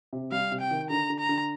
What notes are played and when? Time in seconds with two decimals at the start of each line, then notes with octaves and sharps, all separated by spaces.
0.13 C3
0.32 G3 F5
0.52 C3
0.61 G5
0.71 D#3
0.90 D3 A#5
1.10 D3
1.20 A#5
1.29 D3